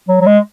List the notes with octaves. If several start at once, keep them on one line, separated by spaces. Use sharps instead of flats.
F#3
F#3
G#3